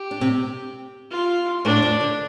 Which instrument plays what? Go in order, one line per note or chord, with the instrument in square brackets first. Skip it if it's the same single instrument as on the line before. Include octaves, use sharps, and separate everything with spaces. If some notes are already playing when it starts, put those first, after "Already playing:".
Already playing: [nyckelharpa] G4
[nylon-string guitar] D4
C3 C4
[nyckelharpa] F4
[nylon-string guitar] A2 A3 [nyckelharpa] D4
[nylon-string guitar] F2 F3
D3